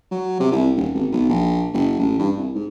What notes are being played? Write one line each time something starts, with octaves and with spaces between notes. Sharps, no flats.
F#3
C3
C2
D#1
G#1
B1
A#1
F#1
A1
G2
C2
G#2